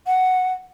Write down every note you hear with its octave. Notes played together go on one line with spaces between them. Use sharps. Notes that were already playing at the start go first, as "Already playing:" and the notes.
F#5